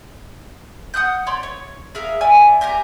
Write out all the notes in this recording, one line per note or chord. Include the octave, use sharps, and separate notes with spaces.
F#5 D#6 F#6 G6
C#5 D5 B5 C6
C#5
G#4 A#4 E5 F5
E4 D5 G#5 E6
G4 A#4 G#5 A#5